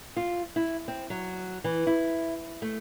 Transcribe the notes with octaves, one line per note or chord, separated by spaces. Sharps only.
F4
E4
C4
F#3
E3
E4
A3